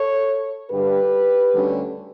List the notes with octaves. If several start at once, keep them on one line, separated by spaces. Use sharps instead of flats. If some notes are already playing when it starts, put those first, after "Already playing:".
Already playing: A4 C#5
G2 D3 G3 G4 B4
D2 D3 G3 C#4